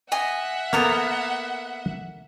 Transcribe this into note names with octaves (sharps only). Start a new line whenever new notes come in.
D#5 E5 F#5 G#5
A#3 B3 A4 A#4 A#5 D#6